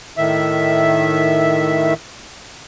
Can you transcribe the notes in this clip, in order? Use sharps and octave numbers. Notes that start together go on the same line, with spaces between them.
A2 D#3 E5